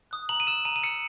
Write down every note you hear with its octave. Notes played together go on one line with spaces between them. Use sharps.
D#6 F#6
A#5 F#7
D#7
E6 E7
A#5 D#7
D#7
E6 C#7